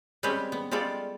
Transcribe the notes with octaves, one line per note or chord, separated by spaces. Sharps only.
G3 G#3 C4 C#4 B4 C5
B3
G3 G#3 F4 A4 D5